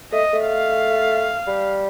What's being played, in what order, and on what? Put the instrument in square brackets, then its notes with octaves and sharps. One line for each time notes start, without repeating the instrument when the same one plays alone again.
[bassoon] A3 [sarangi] D#5
[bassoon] A3
[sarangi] F5
[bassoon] G3